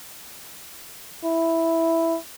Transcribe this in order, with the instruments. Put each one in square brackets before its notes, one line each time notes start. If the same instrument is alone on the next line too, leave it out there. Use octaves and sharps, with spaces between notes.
[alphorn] E4